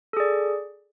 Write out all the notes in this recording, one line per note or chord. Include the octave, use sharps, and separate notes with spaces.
G#4 A4 D5